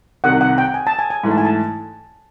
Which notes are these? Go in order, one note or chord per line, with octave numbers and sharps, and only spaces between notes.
C2 C3 D#3 F#5
F#5
G5
G#5
A5
G#5
G#5
G#2 E3 A3
A5
G#5
A5